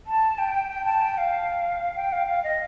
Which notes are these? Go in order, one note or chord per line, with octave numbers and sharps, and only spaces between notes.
A5
G5
G5
A5
G5
F5
G5
F5
F5
D#5